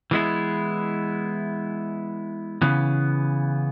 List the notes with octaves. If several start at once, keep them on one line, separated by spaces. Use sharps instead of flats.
E3 G#3 B3 E4
C#3 E3 B3